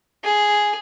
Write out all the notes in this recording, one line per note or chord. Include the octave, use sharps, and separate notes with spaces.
G#4